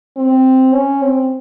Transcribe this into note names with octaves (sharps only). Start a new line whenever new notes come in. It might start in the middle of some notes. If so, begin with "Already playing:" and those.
C4
C#4
C4